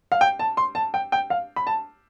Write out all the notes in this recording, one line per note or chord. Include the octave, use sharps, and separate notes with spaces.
F5
G5
A5
C6
A5
G5
G5
F5
B5
A5